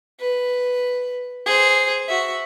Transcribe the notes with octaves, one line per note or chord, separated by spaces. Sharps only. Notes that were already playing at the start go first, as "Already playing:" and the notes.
B4
G#4 C5
F#4 E5